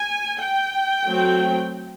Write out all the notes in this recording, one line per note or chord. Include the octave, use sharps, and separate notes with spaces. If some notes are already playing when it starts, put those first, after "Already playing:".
Already playing: G#5
G5
F#3 A3 C4